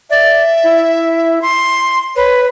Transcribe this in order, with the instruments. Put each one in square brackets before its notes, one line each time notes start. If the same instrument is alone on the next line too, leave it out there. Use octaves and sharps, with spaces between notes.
[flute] D5 [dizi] E5
[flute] E4
C6
[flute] B4 [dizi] C#5